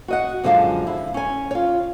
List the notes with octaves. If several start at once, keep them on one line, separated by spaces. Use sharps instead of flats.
F#4 D#5 F#5
F#2 D3 F3 G#3 F5 A5
E4
C#4 G#5
F4 C#5